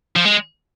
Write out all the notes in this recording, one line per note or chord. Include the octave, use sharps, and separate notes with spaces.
F3
G#3